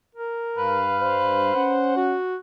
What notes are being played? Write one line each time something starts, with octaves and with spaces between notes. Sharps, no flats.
A#4
G2 B4 F5
C5
C#4 F#5
F#4